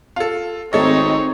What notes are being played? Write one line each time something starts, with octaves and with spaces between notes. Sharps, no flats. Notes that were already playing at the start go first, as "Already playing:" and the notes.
F4 A4
G#1 A3 C4 D#4 G#4 A4 C#5 D#5